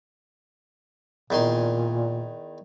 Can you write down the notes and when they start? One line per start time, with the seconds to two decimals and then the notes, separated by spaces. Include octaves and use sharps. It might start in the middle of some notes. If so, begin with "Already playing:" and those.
1.30 E2 A#2 D#3 C6